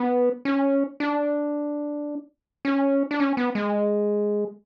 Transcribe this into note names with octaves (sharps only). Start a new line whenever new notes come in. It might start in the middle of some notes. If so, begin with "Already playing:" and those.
Already playing: B3
C#4
D4
C#4
D4
C#4
B3
G#3